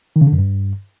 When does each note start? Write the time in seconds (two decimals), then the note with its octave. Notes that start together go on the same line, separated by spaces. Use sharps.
0.16 D#3
0.21 C#3
0.27 D3
0.33 F#2
0.38 G2